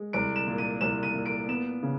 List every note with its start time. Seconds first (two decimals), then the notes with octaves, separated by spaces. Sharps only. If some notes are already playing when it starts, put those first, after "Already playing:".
Already playing: G#3
0.13 C2 D7
0.36 E7
0.47 A#2
0.58 D#7
0.81 C2 E7
1.03 D#7
1.14 A#2
1.26 D7
1.48 B3 E7
1.83 C#3